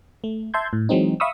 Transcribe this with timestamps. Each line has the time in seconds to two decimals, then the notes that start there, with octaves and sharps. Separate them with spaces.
0.24 A3
0.54 E5 A5 C6 G6 G#6
0.73 A2
0.89 E3 F#3 G#3 C4 D#4
1.20 E5 F5 B5 C#6 D#6 E6